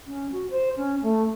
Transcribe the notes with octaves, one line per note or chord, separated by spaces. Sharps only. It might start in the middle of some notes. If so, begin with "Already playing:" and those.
C#4
F#4
C5
C#4
A3